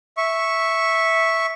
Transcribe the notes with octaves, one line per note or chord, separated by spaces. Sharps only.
E5 C#6